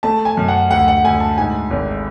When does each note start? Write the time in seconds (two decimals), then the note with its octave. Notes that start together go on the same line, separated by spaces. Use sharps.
0.03 A3 A5
0.25 G#5
0.37 F#2
0.48 F#5
0.70 D2 F#5
0.88 F#5
1.04 D2 G#5
1.20 A5
1.38 G#2 G#5
1.71 G#1